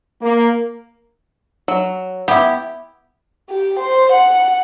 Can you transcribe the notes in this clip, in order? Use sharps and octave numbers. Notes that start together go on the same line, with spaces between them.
A#3
F#3
B3 E4 G4
G4
C5
F#5